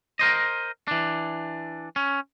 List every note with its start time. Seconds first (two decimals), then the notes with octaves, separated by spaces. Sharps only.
0.19 A#4 C5 D#5
0.88 E3 D4
1.96 C#4